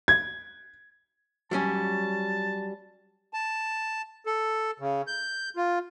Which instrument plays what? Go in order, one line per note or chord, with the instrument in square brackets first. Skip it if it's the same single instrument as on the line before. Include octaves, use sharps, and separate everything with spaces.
[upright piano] G#6
[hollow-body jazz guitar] F#3 G3 C#4 [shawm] A5
[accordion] A5
A4
C#3
G6
F4